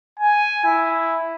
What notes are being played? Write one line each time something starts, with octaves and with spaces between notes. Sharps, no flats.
G#5
E4